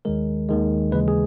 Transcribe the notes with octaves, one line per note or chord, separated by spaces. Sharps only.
D#2 D#3 G#3 A#4
D#2 D#3 G#3
D#2 C#3 E3 G#3 B4
G#4